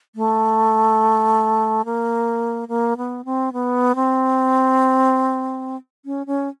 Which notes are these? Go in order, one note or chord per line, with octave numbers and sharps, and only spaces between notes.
A3
A#3
A#3
B3
C4
B3
C4
C#4
C#4